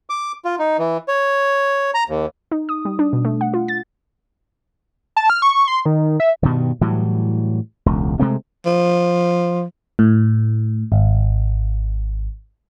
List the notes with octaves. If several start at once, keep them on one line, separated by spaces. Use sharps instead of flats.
D6
F4
D#4
E3
C#5
A#5
D#2
D#4
D#6
G3
D4
B2
A3
F#5
F4
A6
A5
F6
C#6
C6
D#3
E5
G2 B2 D#3
A2 E3 F#3 G3
E1 C#2
C3 G#3 A3 C4
F3
A2
G#1